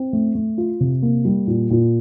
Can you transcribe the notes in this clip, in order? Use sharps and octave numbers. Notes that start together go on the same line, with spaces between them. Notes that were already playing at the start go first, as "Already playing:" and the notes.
Already playing: C4
A3
A3
F4
C3
A#3
G3
A#2
A#2